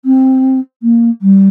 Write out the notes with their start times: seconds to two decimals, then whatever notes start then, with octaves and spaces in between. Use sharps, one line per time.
0.05 C4
0.82 A#3
1.21 G3